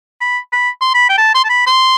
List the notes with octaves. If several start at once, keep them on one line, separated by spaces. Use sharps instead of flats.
B5
B5
C6
B5
G5
A5
C6
A5
B5
C6